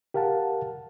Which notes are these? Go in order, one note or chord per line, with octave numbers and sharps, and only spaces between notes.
G4 A#4 F5 F#5 A5